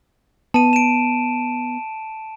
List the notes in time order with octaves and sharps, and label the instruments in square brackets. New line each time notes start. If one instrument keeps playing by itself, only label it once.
[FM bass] B3 [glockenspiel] A5 D#7
[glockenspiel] D7 E7